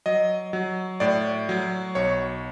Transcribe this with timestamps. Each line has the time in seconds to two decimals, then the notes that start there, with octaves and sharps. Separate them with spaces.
0.06 F#3 D#5
0.53 F#3
1.00 A2 D5
1.49 F#3
1.95 B1 C#5